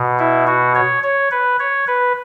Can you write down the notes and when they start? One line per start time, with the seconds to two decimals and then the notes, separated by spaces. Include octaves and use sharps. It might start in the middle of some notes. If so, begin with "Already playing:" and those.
Already playing: B2
0.19 E4
0.47 F#4
0.75 C#5
1.03 C#5
1.31 B4
1.59 C#5
1.87 B4